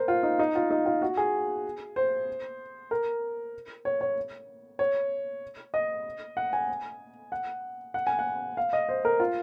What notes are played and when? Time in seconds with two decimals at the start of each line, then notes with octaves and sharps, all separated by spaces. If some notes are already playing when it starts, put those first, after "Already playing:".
Already playing: A#4 C5
0.08 F4
0.23 D#4
0.39 D#4
0.55 F4
0.71 D#4
0.86 F4
1.02 F#4
1.17 G#4
1.96 C5
2.91 A#4
3.85 C#5
4.01 C#5
4.79 C#5
5.74 D#5
6.37 F#5
6.53 G#5
7.32 F#5
7.94 F#5
8.07 G#5
8.19 F#5
8.57 F5
8.73 D#5
8.89 C5
9.05 A#4
9.20 F4